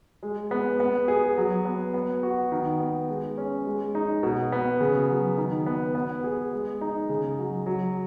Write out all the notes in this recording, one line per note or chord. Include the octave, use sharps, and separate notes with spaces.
G#3
B3
B3
G#4
F#3
B3
B3
F#4
D#3
B3
G#3
C#4
G#3
D#4
B2
B3
C#3
F#3
D#3
B3
B3
G#4
G#3
D#4
C#3
F#3
F#3